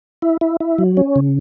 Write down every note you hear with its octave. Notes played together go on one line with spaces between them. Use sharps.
E4
E4
E4
F#3
C#4
C#3